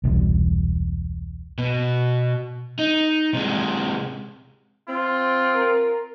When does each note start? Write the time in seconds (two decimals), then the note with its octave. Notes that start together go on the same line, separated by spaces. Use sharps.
0.04 E1 C2
1.58 B2
2.79 D#4
3.34 C3 G#3
4.88 C4 F4
5.55 A#4